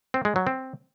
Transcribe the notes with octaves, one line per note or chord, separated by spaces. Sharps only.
C4
G#3
F#3
C4